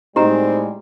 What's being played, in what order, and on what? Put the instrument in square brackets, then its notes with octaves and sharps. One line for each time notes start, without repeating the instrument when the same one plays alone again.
[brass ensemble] A2 G3 G#3 [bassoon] C4 [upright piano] D#4 [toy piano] G4 A#5